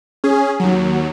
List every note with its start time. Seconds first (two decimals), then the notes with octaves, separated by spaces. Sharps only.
0.24 C#4 G#4
0.60 D#2 F#3